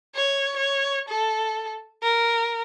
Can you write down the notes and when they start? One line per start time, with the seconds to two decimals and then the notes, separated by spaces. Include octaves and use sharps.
0.16 C#5
0.57 C#5
1.08 A4
2.02 A#4